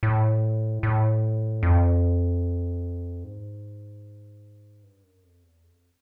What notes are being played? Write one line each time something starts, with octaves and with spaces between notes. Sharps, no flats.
A2
A2
F2
G#2
G2
F#2
F2
E2
F2